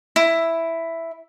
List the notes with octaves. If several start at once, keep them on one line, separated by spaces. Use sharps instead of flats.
E4